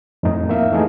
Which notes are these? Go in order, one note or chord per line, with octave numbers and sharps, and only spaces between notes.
F2 A2 F#3 D#4
A#3 E5 F5
E3 A3 D#4 G#4